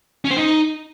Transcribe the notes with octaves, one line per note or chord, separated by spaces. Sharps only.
C#4
C5
D#4